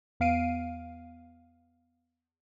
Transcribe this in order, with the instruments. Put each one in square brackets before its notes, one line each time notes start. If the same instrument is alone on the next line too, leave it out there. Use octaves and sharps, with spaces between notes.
[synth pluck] E2 B3 F5 C7 D7 D#7